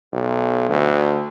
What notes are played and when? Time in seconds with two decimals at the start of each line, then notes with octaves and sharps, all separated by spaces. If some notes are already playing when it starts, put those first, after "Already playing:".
0.13 B1
0.69 D2